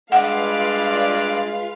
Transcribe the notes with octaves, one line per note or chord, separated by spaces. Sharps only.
G2 G#3 F4 B4 D5 F5 F#5